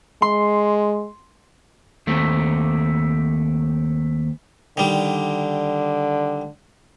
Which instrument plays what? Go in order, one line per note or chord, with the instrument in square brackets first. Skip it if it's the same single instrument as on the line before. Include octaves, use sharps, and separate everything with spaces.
[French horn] G#3 [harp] C6
[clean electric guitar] D#2 A3 C4
[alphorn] D3 [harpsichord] D#3 G3